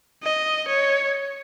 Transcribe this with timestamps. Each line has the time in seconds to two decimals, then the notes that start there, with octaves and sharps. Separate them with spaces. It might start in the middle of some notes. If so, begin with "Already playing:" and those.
0.23 D#5
0.68 C#5